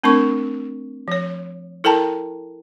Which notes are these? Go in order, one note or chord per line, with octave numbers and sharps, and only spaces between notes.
A3 C4 D4 A#4 C#6
F3 C#5
E4 A4 A#4 G5 A5 A#5